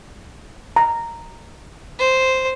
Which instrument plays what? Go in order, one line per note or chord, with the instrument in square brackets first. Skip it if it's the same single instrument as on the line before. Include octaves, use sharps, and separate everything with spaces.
[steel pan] A#5
[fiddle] C5